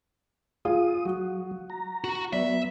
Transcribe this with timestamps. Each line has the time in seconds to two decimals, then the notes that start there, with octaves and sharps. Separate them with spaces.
0.65 F4 G#4 F5 D#6
1.05 F#3 F#4
1.70 A#5
2.04 F#4
2.33 F#3 B3 D5 E5